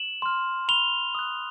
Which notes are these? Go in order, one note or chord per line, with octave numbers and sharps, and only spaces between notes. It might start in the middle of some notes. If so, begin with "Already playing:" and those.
Already playing: E7 F#7
C6 F6
B5 F7 G7
D#6 F#6